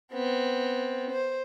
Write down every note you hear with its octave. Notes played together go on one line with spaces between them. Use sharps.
B3 C4
C5